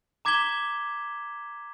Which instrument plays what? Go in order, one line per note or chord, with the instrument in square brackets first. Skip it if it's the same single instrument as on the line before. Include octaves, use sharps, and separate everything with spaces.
[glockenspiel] A#5 D6 G#6 B6 E7 G7